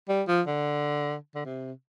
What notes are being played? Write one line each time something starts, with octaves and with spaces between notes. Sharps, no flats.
G3
F3
D3
D3
C3